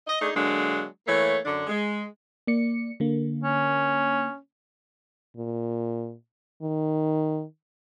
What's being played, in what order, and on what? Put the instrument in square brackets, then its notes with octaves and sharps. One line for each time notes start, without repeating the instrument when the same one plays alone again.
[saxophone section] D#5
A3 D4 D#4 G#4
D3 F#3 G#3 A#3 D4
E3 A3 A#3 C#5
F#2 D3 D4
G#3
[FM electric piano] A#3 D5 C#7
D3 A#3
[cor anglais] C#4
[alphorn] A#2
D#3